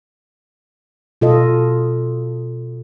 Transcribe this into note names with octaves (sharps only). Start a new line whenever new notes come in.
B2 F4 A4 D#5